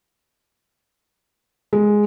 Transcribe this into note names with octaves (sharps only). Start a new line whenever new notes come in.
G#3